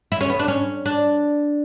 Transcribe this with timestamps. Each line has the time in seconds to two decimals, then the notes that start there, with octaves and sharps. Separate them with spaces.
0.12 E4
0.21 C#4
0.30 B3
0.39 D4
0.48 C#4
0.86 D4